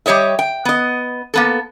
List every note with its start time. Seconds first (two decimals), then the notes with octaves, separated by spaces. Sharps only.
0.06 G3 G4 C#5 D#5 E5
0.39 G5
0.65 B3 D#5
1.34 A#3 B3 A4